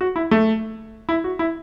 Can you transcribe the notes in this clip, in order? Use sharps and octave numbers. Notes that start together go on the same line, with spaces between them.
F#4
E4
A3
E4
F#4
E4